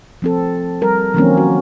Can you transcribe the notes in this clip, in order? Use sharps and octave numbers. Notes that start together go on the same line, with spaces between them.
F3 C4 A4
G3 A#4
D#3 F3 F#3 A#3 C4 C#4
F#4